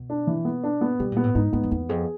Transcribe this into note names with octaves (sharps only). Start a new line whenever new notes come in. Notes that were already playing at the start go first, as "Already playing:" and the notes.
Already playing: B2
D4
E3
B3
D4
B3
B2 G3
A#2 B3
A2
G#2 D#4
G#2 B3
F2
E2 B3
F2 G#4